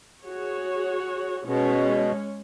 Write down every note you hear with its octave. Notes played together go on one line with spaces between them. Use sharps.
F#4 G#4 C#5
B2 G#3 C#4 C#5